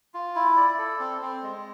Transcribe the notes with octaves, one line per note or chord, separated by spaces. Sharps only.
F4
E4
D5
A4
C4
C4
G#3